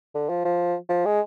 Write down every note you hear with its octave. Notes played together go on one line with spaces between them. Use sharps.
D3
F3
F3
F3
G#3